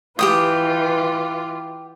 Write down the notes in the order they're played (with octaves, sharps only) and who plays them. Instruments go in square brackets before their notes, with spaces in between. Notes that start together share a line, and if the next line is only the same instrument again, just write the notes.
[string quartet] E3 F4 B4 [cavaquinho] G4 G5 D#6